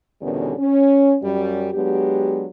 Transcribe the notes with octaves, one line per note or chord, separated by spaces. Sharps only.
E2 B2 D3 D#3 G3 C#4
C#4
F#2 G3
F#3 G#3 B3 D4 G4